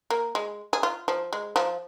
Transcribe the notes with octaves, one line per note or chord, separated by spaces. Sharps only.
A#3
G#3
G#4
F4
F3
G#3
F3